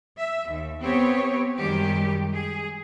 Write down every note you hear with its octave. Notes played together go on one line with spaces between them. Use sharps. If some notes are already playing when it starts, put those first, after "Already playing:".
E5
D#2
B3 C4 G4 C#5
F#2 D#3 G3 G#3 G4
G#4